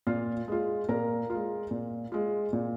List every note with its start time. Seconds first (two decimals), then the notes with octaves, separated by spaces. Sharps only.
0.07 A#2 F4 F5
0.48 G#3 F4
0.89 A#2 A#4 A#5
1.30 G#3 F4
1.71 A#2
2.12 G#3 F4
2.53 A#2